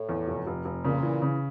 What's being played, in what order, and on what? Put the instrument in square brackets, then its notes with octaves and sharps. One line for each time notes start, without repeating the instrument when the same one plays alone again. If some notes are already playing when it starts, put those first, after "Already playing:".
Already playing: [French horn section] A2
[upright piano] E2
F1
F1
F1
[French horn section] A#2 [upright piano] C#3
[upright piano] E3
C#3